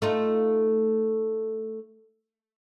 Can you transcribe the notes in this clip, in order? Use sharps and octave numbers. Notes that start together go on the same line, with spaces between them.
A3 D#4 F4